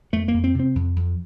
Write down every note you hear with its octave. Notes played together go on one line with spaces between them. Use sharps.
F2 A3
A#3
F2
C4
C3 C4
F2
F2